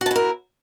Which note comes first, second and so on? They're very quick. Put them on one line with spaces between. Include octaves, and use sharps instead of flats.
F#4 A5 E4 A#4